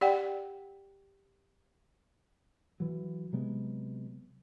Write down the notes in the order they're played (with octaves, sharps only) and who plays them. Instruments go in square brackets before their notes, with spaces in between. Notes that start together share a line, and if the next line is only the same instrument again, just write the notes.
[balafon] G4 D5 F#5 G5
[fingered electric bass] E3 F#3
C3 F#3 G#3 B3